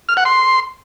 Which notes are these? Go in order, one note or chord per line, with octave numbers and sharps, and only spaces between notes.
F6
F#5
C6